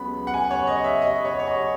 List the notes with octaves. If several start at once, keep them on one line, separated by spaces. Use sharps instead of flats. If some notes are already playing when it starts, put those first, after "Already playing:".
Already playing: C#2 C#3 F#3 B3 B5
F#5
G#5
C#5
D#5
E5
D#5
C#5
C#5
D#5